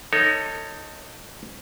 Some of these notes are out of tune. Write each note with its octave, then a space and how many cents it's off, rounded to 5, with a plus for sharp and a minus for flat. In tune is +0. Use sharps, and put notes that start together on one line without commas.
D#4 +0 A4 +30 C#5 +0